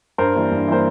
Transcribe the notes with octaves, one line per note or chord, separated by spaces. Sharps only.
G2 A#4 C5
E3 G3 A#3
G2
E3 G3 A#3 C5